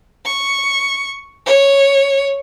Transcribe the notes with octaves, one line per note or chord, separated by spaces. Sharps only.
C#6
C#5